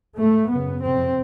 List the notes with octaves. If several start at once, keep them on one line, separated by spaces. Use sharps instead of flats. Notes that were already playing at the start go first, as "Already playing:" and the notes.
G#2 A3
F#2 C#3 B3
F2 C3 C4